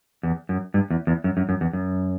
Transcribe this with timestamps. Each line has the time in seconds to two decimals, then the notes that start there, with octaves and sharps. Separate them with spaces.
0.23 E2
0.49 F#2
0.74 G2
0.90 E2
1.07 E2
1.24 F#2
1.37 F#2
1.49 F#2
1.61 E2
1.73 F#2